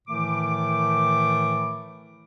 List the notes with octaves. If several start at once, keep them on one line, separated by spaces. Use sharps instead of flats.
A2 D#3 E3 A3 D6